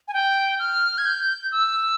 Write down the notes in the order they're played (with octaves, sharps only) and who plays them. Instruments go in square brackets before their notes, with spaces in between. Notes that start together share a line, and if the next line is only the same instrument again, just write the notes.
[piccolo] G#5
G5
F6
G#6
G6
E6